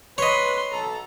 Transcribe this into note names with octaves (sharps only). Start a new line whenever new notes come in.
B4 C#5 D#5 B5 C6
B1 A4 A#5